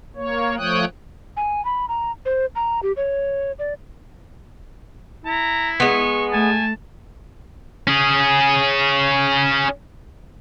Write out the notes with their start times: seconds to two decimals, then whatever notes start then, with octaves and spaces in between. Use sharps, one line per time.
0.16 A#3 C#5
0.57 F3 A3 C#5 G5 D#6 F#6
1.37 G#5
1.65 B5
1.89 A#5
2.25 C5
2.55 A#5
2.83 G4
2.97 C#5
3.59 D5
5.26 E4 A#5
5.80 G#3 B3 C#6
6.33 A3 G#5 A5
7.87 C#4 G#4